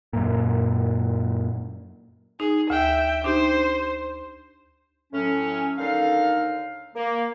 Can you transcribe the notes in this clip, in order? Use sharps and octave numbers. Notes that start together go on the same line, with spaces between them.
F#2 A#2
D#4 G#4
D2 E5 G5
D4 D#4 G4 C5
A2 F#3 C#4
D#2 D3 D#4 A4 F5
A#3